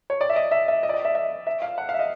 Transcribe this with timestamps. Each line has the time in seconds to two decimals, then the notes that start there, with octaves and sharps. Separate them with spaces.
0.10 C#5
0.21 D5
0.30 E5
0.36 D#5
0.51 E5
0.68 E5
0.83 D#5
0.89 D5
0.94 D#5
1.05 E5
1.15 E5
1.47 E5
1.62 F5
1.78 F#5
1.89 F5
1.94 E5
1.99 D#5